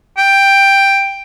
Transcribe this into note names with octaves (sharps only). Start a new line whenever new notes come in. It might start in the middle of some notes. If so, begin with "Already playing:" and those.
G5